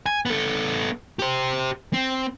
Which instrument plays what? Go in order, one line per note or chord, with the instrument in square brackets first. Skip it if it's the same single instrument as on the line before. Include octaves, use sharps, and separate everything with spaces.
[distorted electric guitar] G#5
B3 A4
G4 C5
C4